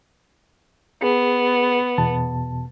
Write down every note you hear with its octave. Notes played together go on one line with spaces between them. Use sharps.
B3 G#4
E2 B2 A5